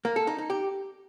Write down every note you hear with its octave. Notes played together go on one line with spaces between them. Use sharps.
A#3
A4
D#4
D#4
G4